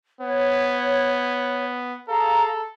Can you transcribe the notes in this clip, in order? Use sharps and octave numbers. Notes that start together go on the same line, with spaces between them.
B3 C#5
G#4 A4 F5 A#5